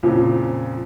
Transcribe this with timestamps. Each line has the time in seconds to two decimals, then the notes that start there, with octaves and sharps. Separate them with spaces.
0.03 F2 A#2 C#3 F3